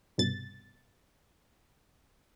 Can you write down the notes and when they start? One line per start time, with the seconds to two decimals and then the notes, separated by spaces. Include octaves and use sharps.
0.18 C2 G2 B2 A6